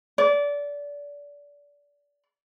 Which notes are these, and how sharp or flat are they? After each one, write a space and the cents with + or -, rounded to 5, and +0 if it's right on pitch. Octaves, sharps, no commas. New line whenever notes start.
D5 -25